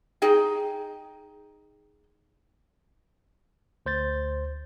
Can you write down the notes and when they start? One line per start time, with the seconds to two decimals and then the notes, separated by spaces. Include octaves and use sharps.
0.22 D#4 G#4 D#5 G5
3.86 D2 C5 G6 A6